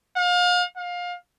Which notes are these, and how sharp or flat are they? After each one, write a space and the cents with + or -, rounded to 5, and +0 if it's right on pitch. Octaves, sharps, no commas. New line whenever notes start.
F5 +35
F5 +25